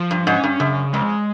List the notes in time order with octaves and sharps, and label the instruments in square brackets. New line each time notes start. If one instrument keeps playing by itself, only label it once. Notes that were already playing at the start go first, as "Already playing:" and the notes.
Already playing: [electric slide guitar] F3
[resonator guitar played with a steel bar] G2
[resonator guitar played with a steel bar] G#2 [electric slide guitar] C#4
[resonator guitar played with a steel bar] G2
[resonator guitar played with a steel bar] F#2 [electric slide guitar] C#3
[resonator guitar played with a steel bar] F2 [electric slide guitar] G#3